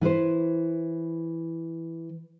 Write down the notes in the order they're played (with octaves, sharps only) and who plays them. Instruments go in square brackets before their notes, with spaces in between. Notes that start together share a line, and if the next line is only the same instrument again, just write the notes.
[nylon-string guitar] E3 E4 B4 C5